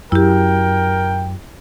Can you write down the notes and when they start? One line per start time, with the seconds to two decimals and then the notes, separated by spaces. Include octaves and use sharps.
0.12 F#2 E4 G4 A#4 G5